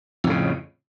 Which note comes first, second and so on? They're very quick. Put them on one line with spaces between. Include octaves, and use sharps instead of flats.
F2 A2 C#3